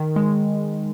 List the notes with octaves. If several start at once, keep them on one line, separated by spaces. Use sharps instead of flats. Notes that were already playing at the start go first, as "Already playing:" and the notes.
Already playing: D#3
G#3